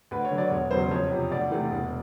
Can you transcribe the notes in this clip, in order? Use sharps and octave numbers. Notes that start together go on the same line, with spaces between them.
D2 B4
C#5
D3 F#3
D5
E1 C#5
E2 C#3 F#3 C5
F2 C#5
C3 F3
D2 D5
C3 E3 A3
E1